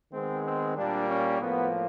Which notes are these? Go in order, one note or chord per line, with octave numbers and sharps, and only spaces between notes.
D#3 G#3 B3 C4
C4
A#2 G3 A#3 D4
C#4
A2 F3 A#3 B3